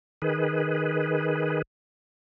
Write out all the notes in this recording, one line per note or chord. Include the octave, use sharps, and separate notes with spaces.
D#3 G#4 B4